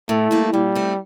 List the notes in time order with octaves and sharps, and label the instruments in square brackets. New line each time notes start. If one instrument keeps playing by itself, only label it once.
[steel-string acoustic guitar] A2 [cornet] A3
[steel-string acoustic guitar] G3 A#3 E4
[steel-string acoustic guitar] A#2 [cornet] G3
[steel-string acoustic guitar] A3 C4